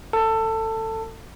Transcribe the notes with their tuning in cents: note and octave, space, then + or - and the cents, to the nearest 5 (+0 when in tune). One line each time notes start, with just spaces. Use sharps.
A4 +20